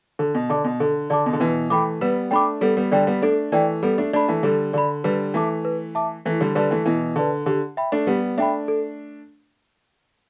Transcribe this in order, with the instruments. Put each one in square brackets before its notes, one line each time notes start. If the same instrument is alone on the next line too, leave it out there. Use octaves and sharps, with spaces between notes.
[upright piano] D3 [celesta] A4
[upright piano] B2
[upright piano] D3 [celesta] D5 A5 D6
[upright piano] B2
[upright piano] D3 [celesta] A4
[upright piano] D3 [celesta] D5 A5 D6
[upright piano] B2
D3
[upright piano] B2 E3 [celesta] B4
[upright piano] E3 A3 [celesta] G5 B5 D6
[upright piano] G3 B3 [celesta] B4
[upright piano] A3 D4 [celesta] G5 B5 D6
[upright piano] G3 B3 [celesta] A4
[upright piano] G3 B3
[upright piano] D3 G3 [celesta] D5 G5
[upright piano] G3 B3
[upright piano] A3 D4 [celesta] A4
[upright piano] E3 A3 [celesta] D5 G5
[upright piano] G3 B3 [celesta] A4
[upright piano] A3 D4
[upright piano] A3 D4 [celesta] D5 B5
[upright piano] E3 A3
[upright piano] D3 G3 [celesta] A4
[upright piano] D3 [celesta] D5 B5
[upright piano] D3 G3 [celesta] B4
[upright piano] E3 A3 [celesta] E5 A5 D6
[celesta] B4
E5 A5 D6
[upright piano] E3 A3 [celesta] E4
[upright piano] D3 G3
[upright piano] D3 G3 [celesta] B4 D5 A5
[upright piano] E3 A3
[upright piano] B2 E3 [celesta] E4
[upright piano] D3 [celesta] B4 D5 A5
[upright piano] D3 [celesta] G4
[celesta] E5 G5 B5
[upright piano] A3 D4
[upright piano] G3 B3 [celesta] G4
[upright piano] A3 D4 [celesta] E5 G5 B5
[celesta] A4